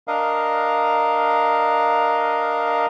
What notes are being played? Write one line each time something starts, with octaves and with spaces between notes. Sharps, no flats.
D4 A#4 D#5 F5